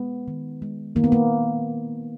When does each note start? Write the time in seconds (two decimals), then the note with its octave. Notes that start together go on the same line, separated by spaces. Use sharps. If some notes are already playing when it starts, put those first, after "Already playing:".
Already playing: G#3 B3
0.28 D#3
0.62 G#3
0.96 D#3 A#3
1.04 B3
1.12 A#3